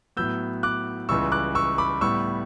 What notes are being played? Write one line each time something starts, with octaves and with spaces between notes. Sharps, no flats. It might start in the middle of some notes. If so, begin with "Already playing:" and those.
A2 F#3 B3 E6 G6
D6 F#6
C#2 C#3 E3 G3 C#6 E6
D6 F#6
C#6 E6
B5 D6
A2 G3 B3 C#6 E6